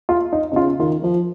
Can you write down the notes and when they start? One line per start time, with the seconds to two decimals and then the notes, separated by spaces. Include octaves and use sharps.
0.09 F4
0.32 D#4
0.52 C3 D#4
0.56 C#3 F4
0.79 D#3 F4
1.03 F3 F4